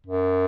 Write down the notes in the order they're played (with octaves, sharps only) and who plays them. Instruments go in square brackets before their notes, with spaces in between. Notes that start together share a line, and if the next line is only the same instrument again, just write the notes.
[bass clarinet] F#2